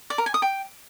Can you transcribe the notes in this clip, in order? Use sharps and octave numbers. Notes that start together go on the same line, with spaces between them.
D5
A#4
G#5
D#6
G5